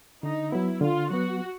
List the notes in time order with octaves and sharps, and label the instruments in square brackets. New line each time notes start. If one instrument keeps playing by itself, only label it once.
[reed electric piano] D3 [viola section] D#4
[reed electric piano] F#3 B3 [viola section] E4
[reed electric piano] D3 [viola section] F4
[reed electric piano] F#3 B3 [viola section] F#4